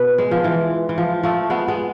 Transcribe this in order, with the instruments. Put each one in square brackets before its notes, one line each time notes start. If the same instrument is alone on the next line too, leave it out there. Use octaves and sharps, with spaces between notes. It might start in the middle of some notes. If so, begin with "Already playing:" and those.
Already playing: [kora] B2 [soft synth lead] B4
[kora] G#3
F3
E3
E3
F3
F3 A3
G#3 B3
G#3 B3